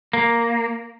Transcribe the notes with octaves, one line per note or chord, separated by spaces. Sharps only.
A#3